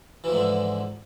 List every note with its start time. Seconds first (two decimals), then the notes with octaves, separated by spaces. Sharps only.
0.24 E3
0.28 F3
0.32 G#2
0.36 D3